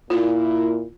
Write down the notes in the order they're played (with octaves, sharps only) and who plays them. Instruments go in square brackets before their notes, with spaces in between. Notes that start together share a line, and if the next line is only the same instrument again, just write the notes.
[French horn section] A#2 E4 [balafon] F4